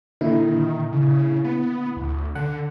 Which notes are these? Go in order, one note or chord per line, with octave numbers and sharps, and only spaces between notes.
A#2 D3 D#3 E4
C#3
B3
D2
D3 F#5